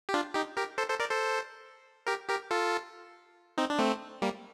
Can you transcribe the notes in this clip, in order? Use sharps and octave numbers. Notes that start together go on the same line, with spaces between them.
G4
D4 F4
D#4 G4
G4 A#4
A4 C5
A4 C5
A#4 D5
A4 C5
G4 A#4
G4 A#4
F4 A4
C4 D#4
D4
A3 C4
G3 A#3